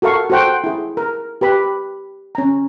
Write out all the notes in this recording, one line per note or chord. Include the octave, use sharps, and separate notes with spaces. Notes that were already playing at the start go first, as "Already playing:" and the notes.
F#4 A4 A#4 F5 C#6
F#4 A4 C5 F#5 G5
E4 G#4
A#4
G4 B4 B5
C#4 A#5